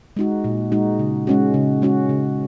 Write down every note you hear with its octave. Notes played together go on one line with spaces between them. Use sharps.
G#3 D#4 F#4
A#2
G#3 D#4 F#4
C#3
G#3 C#4 F#4
C#3
G#3 C#4 F#4
C#3